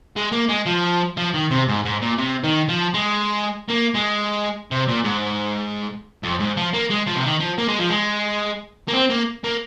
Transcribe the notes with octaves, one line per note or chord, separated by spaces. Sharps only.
G#3
A#3
G#3
F3
F3
D#3
C3
G#2
G#2
A#2
C3
D#3
F3
G#3
A#3
G#3
C3
A#2
G#2
F2
G#2
F3
A#3
G#3
F3
C3
D#3
F3
A#3
G#3
F3
G#3
A#3
C4
A#3
A#3